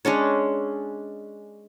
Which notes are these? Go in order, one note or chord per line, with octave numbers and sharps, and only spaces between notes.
G#3 C#4 D4 C#5